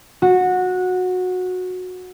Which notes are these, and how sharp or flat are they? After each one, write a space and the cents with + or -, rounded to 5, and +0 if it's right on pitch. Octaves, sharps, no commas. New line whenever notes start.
F#4 -15